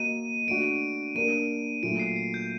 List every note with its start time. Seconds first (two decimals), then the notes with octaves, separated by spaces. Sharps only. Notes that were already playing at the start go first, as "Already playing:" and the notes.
Already playing: A#3 F#4 A#4 D#5 D#7
0.47 A3 D4 F#4 D7
1.15 A#3 D4 G4 A#4 D#7
1.83 A#2 F#3 A3 D7
1.99 C7
2.16 C7
2.34 G6